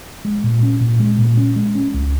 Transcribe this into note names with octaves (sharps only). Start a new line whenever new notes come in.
G#3
A#2
C#4
A#2
G#3
A#2
C#4
G#3
C#4
C#2